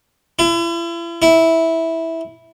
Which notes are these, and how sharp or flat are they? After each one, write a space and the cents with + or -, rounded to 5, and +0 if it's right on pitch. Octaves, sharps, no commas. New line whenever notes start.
E4 +40
E4 -10